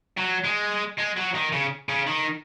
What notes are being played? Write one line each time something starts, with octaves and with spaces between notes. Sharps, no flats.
F#3
G#3
G#3
F#3
D#3
C#3
C#3
D#3